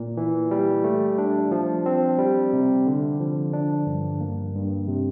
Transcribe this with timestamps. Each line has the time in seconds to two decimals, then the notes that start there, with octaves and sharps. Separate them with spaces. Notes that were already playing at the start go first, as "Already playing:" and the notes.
Already playing: A#2
0.17 E3
0.51 G3
0.84 A3
1.18 D4
1.51 F3
1.86 C4
2.19 G3
2.53 C3
2.87 D3
3.20 F3
3.53 D4
3.87 G2
4.21 A#3
4.55 G2
4.88 C3